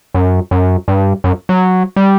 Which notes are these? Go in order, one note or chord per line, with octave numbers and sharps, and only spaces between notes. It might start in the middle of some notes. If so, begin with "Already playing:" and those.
F#2
F#2
G2
F#2
F#3
G3